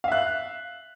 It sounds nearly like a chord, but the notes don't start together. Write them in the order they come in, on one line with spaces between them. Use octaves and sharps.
F5 E5 F#6